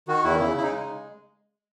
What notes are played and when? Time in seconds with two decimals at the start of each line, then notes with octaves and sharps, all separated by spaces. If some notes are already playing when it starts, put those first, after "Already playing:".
0.08 D#3 F#4
0.24 E2 E4
0.39 C#3 E4
0.55 C#3 E4
0.63 D#4
0.71 G#3